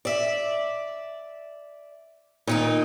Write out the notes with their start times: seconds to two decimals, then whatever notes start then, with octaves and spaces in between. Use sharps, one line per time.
0.05 D5 E5
2.47 A#2 D#3 D#4